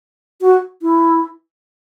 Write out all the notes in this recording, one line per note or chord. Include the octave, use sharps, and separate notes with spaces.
F#4
E4